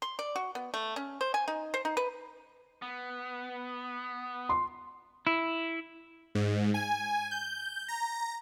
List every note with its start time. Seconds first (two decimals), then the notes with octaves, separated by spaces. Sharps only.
0.02 C6
0.19 D5
0.36 F#4
0.55 B3
0.74 A3
0.96 C#4
1.21 C5
1.34 G#5
1.48 D#4
1.74 C5
1.85 D#4
1.97 B4
2.82 B3
4.49 C6
5.27 E4
6.35 G#2
6.74 G#5
7.31 G6
7.88 A#5